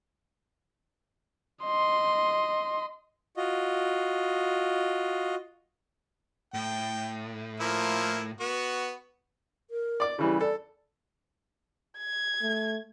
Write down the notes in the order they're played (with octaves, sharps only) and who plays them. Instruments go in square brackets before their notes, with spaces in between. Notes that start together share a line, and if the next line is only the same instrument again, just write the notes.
[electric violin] D#5 C6
[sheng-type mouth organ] F4 F#4 D#5
[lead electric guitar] A2 [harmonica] G5
[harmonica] F3 A#3 E4
B3 F#4
[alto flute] A#4
[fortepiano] D5 D6
[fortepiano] C#3 E3 G3 [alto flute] E4
[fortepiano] A4 [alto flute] D5
[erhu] G#6
[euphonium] A3